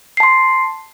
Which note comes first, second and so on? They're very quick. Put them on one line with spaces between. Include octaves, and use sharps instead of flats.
C7 A5 C6